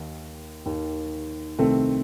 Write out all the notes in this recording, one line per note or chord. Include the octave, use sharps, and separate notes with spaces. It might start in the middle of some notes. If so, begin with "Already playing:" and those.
Already playing: D#2 D#3
D#2 D#3
C2 C3 D#3 A3 C4